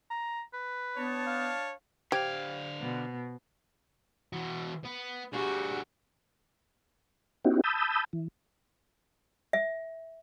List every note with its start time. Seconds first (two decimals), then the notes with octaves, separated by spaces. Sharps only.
0.10 A#5
0.54 B4
0.97 B3 D4 C#5 A5
1.27 F5
2.12 D3 G4 C5 F5 G#6 D7
2.78 B2 B3
4.33 E3 F#4
4.84 B3
5.33 G3 D4 F#4 G#4
7.45 B3 C#4 D#4 E4 F#4 G4
7.64 A5 B5 D#6 E6 G6
8.13 E3
9.53 E5